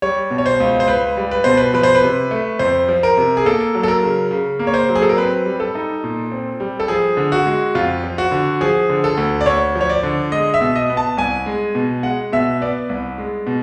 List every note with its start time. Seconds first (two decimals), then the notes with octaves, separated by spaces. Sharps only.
0.02 G3 C#5
0.30 B2
0.38 C#5
0.46 C5
0.60 C#2
0.80 C5
0.88 C#2 B4
1.17 G3
1.31 B4
1.44 B2 C5
1.57 B4
1.74 F3 B4
1.83 C5
1.95 B4
2.03 C3
2.31 A3
2.59 F2 C5
2.88 F3
3.03 A#4
3.17 C3
3.37 G#4
3.46 A#3 A4
3.75 F#3
3.83 A4
3.88 A#4
4.03 C#3
4.31 C#3
4.59 A#3
4.67 C#5
4.74 C5
4.89 F#3
4.95 G#4
5.02 A4
5.09 A#4
5.17 C4 B4
5.46 G3
5.60 A4
5.75 D#4
6.04 A#2
6.32 C4
6.60 G3
6.80 A4
6.88 F3 G#4
7.17 D3
7.32 F#4
7.46 G#3
7.75 F2 F4
8.04 F3
8.18 F#4
8.31 D3
8.61 F3 G#4
8.89 D3
9.04 A4
9.17 D2
9.41 D5
9.46 D2 C#5
9.75 F3
9.81 C#5
9.89 D5
10.03 D3
10.32 G#3 D#5
10.54 E5
10.61 B2
10.76 D#5
10.90 B3
10.97 A5
11.17 C2 G#5
11.46 G#3
11.75 B2
12.03 G#3 F#5
12.32 B2 E5
12.61 B3 D5
12.89 C2
13.18 G#3
13.47 B2